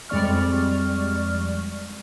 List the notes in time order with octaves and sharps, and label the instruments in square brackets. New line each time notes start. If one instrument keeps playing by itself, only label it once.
[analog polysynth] F2 G3 G#3 D5 C#6 F6